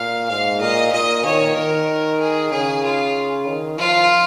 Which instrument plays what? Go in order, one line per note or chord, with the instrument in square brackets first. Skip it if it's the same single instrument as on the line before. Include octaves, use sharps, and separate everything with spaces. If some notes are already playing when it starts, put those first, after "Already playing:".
Already playing: [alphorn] A#2 [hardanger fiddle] F5
[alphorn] G#2 [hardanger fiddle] F5
[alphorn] A#2 [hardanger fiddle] D#5
[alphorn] A#2 [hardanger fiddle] D#5
[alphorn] D#3 [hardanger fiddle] C#5
[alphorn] D#3 [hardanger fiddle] A#4
[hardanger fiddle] G#4
[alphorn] C#3 [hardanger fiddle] G#4
[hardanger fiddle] F4
[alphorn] D#3
[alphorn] F3 [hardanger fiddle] F4